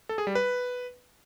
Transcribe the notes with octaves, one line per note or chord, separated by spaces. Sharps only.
A4
G#4
G3
B4